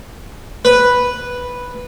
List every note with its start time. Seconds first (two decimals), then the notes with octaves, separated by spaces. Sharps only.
0.65 B4